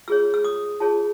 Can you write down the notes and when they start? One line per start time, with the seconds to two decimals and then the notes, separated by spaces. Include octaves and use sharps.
0.08 F4 G#4 C#5 E6
0.34 E6
0.44 D#6
0.80 F4 G#4 C#5 A5